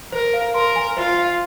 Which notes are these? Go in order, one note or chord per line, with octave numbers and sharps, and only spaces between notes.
A#4 C5
F5
A#4 C6
G#5
F4 C5
F5